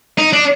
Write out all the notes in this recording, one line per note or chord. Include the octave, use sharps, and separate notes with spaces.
D#4
D4